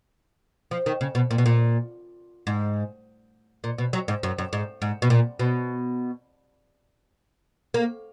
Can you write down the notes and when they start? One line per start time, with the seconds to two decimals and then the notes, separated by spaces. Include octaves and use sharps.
0.71 F3
0.86 D#3
1.01 C#3
1.15 B2
1.31 A#2
1.38 B2
1.46 A#2
2.47 G#2
3.64 A#2
3.78 B2
3.93 F#3
4.08 G#2
4.23 F#2
4.38 F#2
4.53 G#2
4.82 G#2
5.02 B2
5.10 A#2
5.39 B2
7.74 A#3